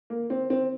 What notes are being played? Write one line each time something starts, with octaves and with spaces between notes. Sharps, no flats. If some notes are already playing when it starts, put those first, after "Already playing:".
A#3
C4
C4